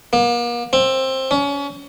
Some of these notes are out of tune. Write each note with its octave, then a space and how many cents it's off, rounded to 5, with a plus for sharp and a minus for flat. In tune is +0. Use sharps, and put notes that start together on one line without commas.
A#3 +40
C4 +15
C#4 +30